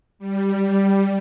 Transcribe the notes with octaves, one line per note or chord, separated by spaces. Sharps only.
G3